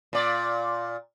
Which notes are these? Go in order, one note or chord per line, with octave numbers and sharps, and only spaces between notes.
A#2 D5